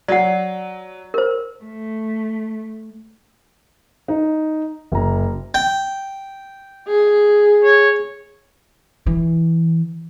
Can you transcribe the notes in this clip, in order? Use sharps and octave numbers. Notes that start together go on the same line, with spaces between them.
F#3 D5 F#5
A#4 C5
A3
D#4
F#1 A#5
G5
G#4
C#5
E3